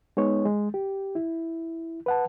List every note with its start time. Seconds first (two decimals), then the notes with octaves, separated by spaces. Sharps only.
0.17 G#3 B3 D#4 C#5
0.46 G#3
0.74 G4
1.15 E4
2.06 B4 F#5 A5